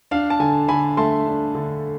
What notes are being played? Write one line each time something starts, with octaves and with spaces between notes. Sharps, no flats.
D4 F5
A5
D3 G#5
D3 G#5 B5
A3 A5 C6
D4
D3